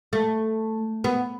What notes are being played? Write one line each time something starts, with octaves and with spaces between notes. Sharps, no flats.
A3
B3